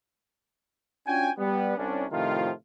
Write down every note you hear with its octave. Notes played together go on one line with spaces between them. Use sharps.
C#4 D4 F4 F#4 G5 G#5
G3 B3
C2 C#4 D4
A2 C3 D#3 F3 F4